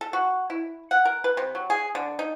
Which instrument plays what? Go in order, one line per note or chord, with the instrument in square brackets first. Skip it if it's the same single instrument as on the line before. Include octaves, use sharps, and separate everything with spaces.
[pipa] A4
F#4
E4
F#5
A#4
B4
C3
F#3
G#4
D3
D#4